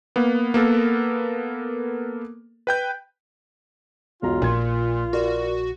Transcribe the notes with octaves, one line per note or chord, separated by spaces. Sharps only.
A#3 B3
A#3 B3 A4 A#4
B4 G5 G6
E1 B1 F4 A#5
A#1 A#2 A#4 C6 G#6
F#4 A#4 D5